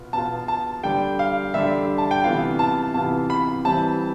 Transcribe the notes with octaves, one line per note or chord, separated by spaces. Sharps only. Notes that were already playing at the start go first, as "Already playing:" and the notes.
Already playing: B2 B3 F4
B2 B3 F4 A5
A5
D3 G3 D4 G5
F5
D3 G3 D4 E5
A5
G5
C3 E3 B3 F4 F5
A5
C3 E3 B3 F4 A5
B5
E3 G3 C4 E4 A5